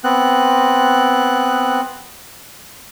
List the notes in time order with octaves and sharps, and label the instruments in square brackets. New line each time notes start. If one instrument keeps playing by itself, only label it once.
[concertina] B3 C4 F#6